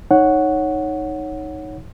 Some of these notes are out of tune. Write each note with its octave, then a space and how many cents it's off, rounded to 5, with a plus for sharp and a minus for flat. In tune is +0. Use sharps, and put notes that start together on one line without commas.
D#4 +0 C#5 +0 F#5 +0